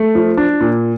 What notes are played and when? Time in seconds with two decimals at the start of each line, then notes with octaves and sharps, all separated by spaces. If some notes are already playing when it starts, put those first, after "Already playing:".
Already playing: A3
0.15 F3
0.37 D4
0.61 A#2